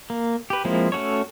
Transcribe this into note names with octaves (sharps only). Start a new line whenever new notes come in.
A#3
G4 B4
F3 G#3 A#3 C4 E4
A3 C#4 F#4 A4 C#5